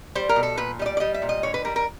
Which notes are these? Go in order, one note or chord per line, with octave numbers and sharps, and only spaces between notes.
G3 C5
A#4
B2
A4
A#2 B4
G3 D#5
D5
D5
G3 D#5
E5
A#2
D#5
D3 C#5
B4
G3 A#4
A#4